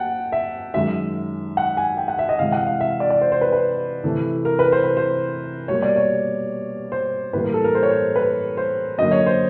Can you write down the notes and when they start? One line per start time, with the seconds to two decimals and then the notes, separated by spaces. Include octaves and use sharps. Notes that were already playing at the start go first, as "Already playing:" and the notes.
Already playing: F#3 A#3 F#5 G5 A5
0.32 E5
0.74 F#2 D#3 G#3 E5
1.57 F#5
1.77 G#5
1.97 G5
2.08 F#5
2.19 E5
2.29 D#5
2.39 C3 E3 G#3 F5
2.52 F#5
2.67 F5
2.80 E5
2.90 F5
3.00 D5
3.10 D5
3.21 C5
3.32 C5
3.41 B4
3.53 B4
4.04 C3 E3 A3
4.45 A#4
4.59 B4
4.72 C5
4.84 B4
4.97 C5
5.68 B2 G3 A#3 C#5
5.82 D5
5.96 C#5
6.92 C5
7.33 A2 E3 G3 A#3 B4
7.44 A#4
7.54 A4
7.64 A#4
7.75 C5
7.83 C#5
7.90 C5
8.16 B4
8.57 C5
8.98 F#2 D3 F#3 A#3 D#5
9.11 C#5
9.26 C5